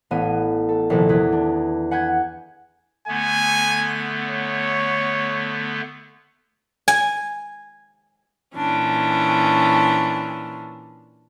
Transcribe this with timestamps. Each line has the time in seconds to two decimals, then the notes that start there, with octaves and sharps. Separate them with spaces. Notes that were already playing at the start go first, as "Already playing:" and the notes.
0.11 A1 B3 D#7
0.69 A4
0.90 A#1 C3 D#3 E4 A4 G#5
1.09 E2 G#4 B4
1.32 D4
1.91 F#5 G#5 B5 G6 G#6
3.08 D3 A3 B3 G#5
4.26 C#5
6.88 G#5
8.55 A#2 E3 C#4 D4